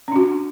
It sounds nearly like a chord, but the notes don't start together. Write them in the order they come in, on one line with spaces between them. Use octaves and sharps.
C#4 D4 F#4